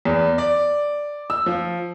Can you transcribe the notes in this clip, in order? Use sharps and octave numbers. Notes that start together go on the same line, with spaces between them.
E2
D5
E6
F3